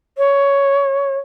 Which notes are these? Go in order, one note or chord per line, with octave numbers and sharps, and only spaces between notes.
C#5